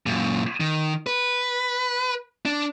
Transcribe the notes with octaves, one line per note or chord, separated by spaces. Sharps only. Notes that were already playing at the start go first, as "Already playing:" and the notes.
F#2 A#2
D#3
B4
D4